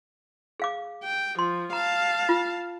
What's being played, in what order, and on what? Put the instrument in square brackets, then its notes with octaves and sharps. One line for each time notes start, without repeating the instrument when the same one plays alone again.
[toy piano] G#4 F5 D6
[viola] G5
[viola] F3 [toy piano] C6
[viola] F5 A5 [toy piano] A#5
[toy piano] F4